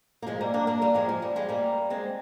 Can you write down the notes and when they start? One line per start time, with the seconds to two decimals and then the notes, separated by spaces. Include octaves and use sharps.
0.22 A#3
0.27 F3 G#3
0.41 G3 A#3
0.54 A#3 D4
0.67 A#3 D4
0.82 G3 A#3
0.94 F3 G#3
1.09 F3
1.22 G3
1.36 F3 G#3
1.49 G3 A#3
1.90 G#3 C4